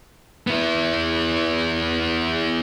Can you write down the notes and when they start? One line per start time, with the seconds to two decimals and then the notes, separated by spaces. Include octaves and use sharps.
0.47 B3 E4